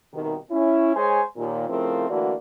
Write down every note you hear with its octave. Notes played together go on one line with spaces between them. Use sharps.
C2 B2 D#3
C#4 E4
G#3 C5 C#5 G#5
D#2 A#2
C#3 F3 A3 C4 E4 A#4
D3 E3 A3 A#3 F#4 D5